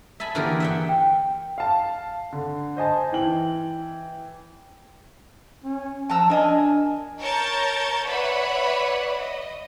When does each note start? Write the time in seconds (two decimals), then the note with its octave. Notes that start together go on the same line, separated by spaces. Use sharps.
0.20 E5 G#5 A5 B5
0.35 D3 E3 A#3 F4 G4 G#4
0.60 E5 F#5 G5
0.89 G5
1.58 F5 A5
2.33 D3
2.77 C5 D#5 G#5 A5
3.12 E3 G5 F#7
5.64 C#4
6.10 F3 A5 A#5 E6
6.30 D4 A#4 D#5 G#5
7.20 A#4 C#5 A5 C#6 G6 A6
8.05 B4 C#5 D5 E5 F#5 B5
9.18 D#5